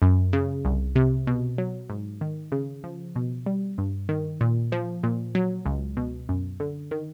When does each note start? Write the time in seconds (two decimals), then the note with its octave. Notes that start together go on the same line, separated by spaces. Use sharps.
0.02 F#2
0.33 C#3
0.65 C2
0.96 C3
1.27 B2
1.58 F#3
1.90 G#2
2.21 D#3
2.52 C#3
2.84 F3
3.16 B2
3.46 G3
3.78 G2
4.09 D#3
4.41 A#2
4.72 F3
5.04 A#2
5.35 F#3
5.66 C#2
5.97 B2
6.29 F#2
6.60 D3
6.91 D#3